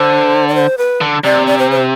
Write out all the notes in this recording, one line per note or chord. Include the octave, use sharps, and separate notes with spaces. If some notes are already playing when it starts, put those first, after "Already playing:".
Already playing: D3 C5
D5
C5
B4
D3
C3 D5
D5
C5
C5